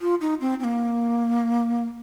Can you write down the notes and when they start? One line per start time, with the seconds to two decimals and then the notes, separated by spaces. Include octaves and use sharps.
0.01 F4
0.21 D#4
0.41 C4
0.60 C4
0.64 A#3